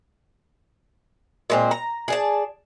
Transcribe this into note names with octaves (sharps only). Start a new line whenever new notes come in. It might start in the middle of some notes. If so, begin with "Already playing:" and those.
A#2 G#3 C4
A#5
G#4 D5 A5